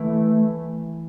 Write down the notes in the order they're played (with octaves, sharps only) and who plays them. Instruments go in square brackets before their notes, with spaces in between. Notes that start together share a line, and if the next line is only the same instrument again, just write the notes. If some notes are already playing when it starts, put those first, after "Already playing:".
Already playing: [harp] E3 [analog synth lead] A3